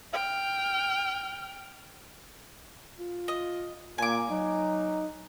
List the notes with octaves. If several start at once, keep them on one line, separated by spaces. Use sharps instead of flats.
G5 F6
F4
D#5
A#2 A#3 G#5 D6
F#3 D#4